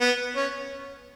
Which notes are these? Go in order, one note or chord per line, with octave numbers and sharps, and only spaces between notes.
B3
C#4